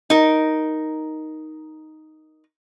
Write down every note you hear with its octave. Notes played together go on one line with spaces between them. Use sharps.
D#4 A#4